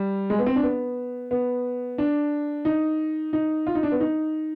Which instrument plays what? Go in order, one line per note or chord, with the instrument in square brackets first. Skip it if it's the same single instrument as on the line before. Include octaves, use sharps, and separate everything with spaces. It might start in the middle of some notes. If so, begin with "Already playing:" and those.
Already playing: [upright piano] G3
G#3
B3
C4
D4
B3
B3
D4
D#4
D#4
F4
D#4
D4
B3
D#4